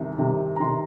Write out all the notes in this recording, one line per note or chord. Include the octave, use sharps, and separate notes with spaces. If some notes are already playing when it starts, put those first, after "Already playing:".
Already playing: C2 C3 D#3
C2 C3 D#3
A#5
C3 D#3 C6